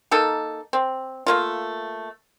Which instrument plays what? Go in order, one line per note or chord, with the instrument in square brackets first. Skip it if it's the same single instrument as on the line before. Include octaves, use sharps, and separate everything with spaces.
[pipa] A#3 D#4 A4
C4
A3 A#3 F4